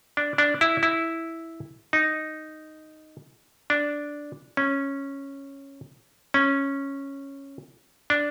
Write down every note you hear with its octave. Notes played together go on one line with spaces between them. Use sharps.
D4
D4
E4
E4
D#4
D4
C#4
C#4
D4